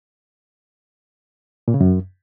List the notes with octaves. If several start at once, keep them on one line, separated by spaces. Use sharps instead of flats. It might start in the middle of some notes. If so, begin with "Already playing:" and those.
A#2
C#3
F#2